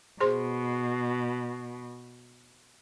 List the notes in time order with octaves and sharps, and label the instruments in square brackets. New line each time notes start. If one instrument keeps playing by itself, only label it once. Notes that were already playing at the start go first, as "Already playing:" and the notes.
[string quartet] B2 [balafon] G#4 C5 C6